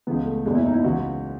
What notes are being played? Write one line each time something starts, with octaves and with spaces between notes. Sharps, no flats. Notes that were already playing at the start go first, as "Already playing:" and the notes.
C#2 C#3 E3 B3
A3
F#1 E2 B2 G#3
E4
D#4
E4
C#2 C#3 E3 F#4